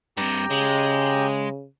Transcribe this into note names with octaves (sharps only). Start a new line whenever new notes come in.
G2 C3 G4 G5 A#5
C#3 G#3